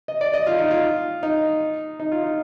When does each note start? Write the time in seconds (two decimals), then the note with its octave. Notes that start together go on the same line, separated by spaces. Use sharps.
0.08 D#5
0.21 D5
0.34 D#5
0.47 F4
0.59 D#4
0.71 F4
1.23 D#4
2.00 D#4
2.12 F4
2.23 D#4